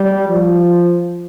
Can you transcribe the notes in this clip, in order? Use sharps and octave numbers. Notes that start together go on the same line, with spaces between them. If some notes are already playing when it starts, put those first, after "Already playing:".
Already playing: G3
F3